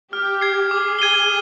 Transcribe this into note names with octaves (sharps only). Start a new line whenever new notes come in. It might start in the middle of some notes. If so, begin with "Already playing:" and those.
G4 F6
G#6 C7
G#4 D6
G#6 D#7 G7